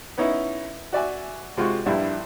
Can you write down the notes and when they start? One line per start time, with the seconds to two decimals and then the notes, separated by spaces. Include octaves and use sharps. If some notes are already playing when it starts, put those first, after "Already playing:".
0.18 B3 C#4 D#4 E4
0.93 F#4 D5 E5 G#5
1.57 C3 G#3 F4 F#4 C#6
1.86 A#1 G2 G3 E4